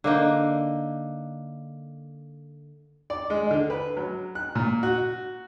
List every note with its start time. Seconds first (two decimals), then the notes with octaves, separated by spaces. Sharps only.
0.04 D3 A#3 D#4
3.10 D5
3.30 G#3
3.51 D3
3.70 B4
3.97 F#3
4.35 F#6
4.55 A#2
4.83 F#4